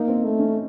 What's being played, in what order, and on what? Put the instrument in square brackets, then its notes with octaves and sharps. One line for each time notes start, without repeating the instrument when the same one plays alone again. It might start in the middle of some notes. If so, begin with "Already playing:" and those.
Already playing: [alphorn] A#3 [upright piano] D#4
[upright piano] C4
[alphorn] A3
[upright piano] C#4